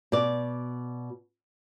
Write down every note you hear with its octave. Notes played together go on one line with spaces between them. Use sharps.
B2 D5